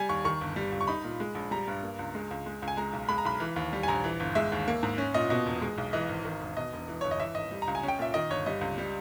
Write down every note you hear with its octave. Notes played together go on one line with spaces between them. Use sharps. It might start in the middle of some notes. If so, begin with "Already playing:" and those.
Already playing: G3 G#5
D#2 C#6
D#3 C#6
G1
G3
C#2
C#6
D#4 B5
A#2
G#3
A#1
G3 A#5
G2
A#3
C#2
G#3
C#2
G#3
C#2
G#5
G#3 A#5
B1
G#3 B5
A#5
B1 B5
E3
D#2
G3
G#5
A#1 A#5
E3
G1
G#3 E5
D#2
A#3
G#2
C#4
A#2 D#5
B2 D#5
E1
G#3
B1
E3 D#5
G#1
D#3
E1
B2 D#5
E1
E3
G1 C#5
D#5
E3 E5
G#1 D#5
G3
A#5
C#2
G#5
C#4
G5
A#2 E5
D#3 D#5
G1 C#5
G3 D#5
C#2
G3